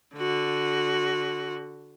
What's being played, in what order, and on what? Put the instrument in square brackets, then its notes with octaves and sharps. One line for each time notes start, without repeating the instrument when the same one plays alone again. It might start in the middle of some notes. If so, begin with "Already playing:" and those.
[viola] D3 F#4